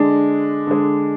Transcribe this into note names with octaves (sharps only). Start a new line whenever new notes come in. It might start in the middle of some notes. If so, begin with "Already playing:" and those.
Already playing: D3 G#3 D4
D3 G#3